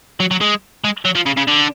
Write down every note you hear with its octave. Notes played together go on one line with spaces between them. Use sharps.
F#3
F#3
G#3
G#3
F#3
F3
C#3
C#3
D3